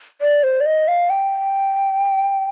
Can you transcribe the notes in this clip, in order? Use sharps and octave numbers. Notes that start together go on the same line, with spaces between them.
D5
C5
D5
D#5
F5
G5